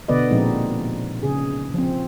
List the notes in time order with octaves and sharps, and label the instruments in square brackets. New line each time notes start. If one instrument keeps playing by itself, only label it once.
[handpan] B2 D3 B3 B4 D5 D#5
A#2 F3 G#3 C4 D#4
C#3 G#4
F3 C4